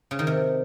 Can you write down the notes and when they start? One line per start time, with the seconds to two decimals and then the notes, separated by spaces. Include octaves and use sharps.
0.11 C#3
0.19 D#3
0.27 C3